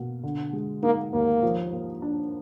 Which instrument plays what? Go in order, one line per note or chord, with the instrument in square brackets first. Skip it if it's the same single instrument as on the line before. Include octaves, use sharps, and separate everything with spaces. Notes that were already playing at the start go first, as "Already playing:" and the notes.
Already playing: [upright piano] B2 A#3
D3
G#3
[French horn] A#3 [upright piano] D#4
[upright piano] D#2 [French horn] A#3
[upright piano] F3
A#3
D4